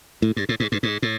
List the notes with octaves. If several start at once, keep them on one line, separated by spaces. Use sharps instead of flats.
A2
G2
A2
G#2
G2
G#2
A2